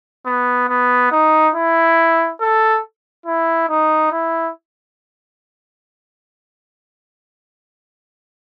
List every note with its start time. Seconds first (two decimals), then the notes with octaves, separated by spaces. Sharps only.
0.26 B3
0.69 B3
1.12 D#4
1.55 E4
2.41 A4
3.26 E4
3.69 D#4
4.12 E4